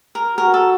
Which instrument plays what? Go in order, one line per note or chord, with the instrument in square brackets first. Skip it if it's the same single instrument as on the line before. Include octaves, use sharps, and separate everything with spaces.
[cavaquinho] A#4
[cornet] F#4 [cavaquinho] A#4
[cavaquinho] A4